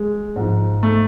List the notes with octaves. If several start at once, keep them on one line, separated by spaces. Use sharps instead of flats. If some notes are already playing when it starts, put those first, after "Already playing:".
Already playing: G#3
G#2 F3
A3